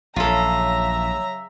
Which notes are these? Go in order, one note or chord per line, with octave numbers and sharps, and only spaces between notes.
A#1 C#3 F#3 F4 A4 E5 A#5